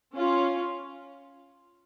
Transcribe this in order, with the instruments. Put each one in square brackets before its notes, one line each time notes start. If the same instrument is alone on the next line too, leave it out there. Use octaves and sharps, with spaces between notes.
[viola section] C#4 F4